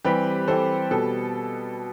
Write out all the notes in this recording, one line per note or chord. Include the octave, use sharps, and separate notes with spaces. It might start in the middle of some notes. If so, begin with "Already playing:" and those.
E3 G3 C4 G4 B4
E3 G3 C4 A4 C5
B2 G3 B3 A4